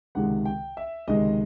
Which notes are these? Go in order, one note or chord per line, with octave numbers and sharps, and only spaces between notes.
C#2 C3 D#3 G#3 F#5
G5
E5
C#2 C3 D#3 G#3 D#5